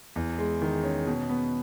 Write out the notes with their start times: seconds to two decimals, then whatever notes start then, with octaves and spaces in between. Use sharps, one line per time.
0.16 E2
0.38 G#3
0.62 D#3
0.84 C#4
1.07 B2
1.29 B3